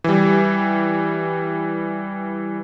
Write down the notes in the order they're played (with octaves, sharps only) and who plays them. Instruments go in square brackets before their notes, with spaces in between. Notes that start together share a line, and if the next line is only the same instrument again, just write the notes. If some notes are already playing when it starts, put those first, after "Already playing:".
[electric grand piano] E3 G3